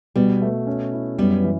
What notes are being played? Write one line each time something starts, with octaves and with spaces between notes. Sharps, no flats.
B2 G3 B3
A3
C#4
E4
F#2 G3 B3
E3